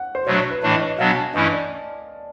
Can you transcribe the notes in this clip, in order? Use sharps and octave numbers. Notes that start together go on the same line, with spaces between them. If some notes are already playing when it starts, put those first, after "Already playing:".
Already playing: F#5
C5
B2 F#3 A3 D4 C#5
C#5
B4
A2 E3 A3 D4 C#5
D#5
C#5
D#5
B2 F#3 B3 D4 F5
G#5
A5
G2 E3 A3 C#4 E4 D#5
D5